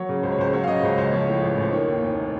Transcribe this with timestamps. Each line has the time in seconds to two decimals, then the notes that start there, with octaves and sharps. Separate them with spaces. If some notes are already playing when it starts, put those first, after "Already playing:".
Already playing: F#3 C#5
0.09 C#3
0.23 C#2 C5
0.32 C#5
0.38 C#2 C5
0.53 F#3 C#5
0.64 F5
0.68 C#3 D#5
0.83 C#2 C5
0.98 C#2 C5
1.13 F3 C#5
1.28 A2
1.42 A1
1.57 A1 C5
1.73 D#3 C#5
1.88 D#2
2.02 F1